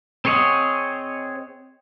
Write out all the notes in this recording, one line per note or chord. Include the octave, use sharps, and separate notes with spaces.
C4 G#4 C#5 D#5 F#5